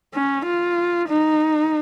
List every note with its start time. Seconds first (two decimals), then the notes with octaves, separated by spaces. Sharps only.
0.14 C#4
0.45 F4
1.09 D#4